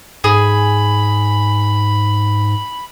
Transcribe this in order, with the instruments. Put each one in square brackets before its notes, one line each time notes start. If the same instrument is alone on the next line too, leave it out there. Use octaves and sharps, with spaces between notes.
[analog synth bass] G#2 [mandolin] G#4 [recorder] B5